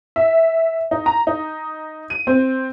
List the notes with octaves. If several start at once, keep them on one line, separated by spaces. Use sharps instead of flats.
E5
D#4
A#5
D#4
D#7
C4